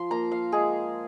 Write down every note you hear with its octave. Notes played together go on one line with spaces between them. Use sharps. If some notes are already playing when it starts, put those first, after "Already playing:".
Already playing: F3 C6
A#3 A#5
F5
G#3 G#4